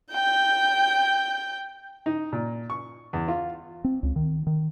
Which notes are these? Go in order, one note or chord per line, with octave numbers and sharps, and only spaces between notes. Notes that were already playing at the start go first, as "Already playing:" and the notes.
G5 G6
D#4
A#2
C#6
E2
F4
C4
C#2
D#3
D#3